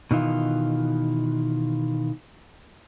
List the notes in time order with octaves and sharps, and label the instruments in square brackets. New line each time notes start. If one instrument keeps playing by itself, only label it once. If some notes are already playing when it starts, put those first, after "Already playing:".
[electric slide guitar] B2 D#3 E3 F4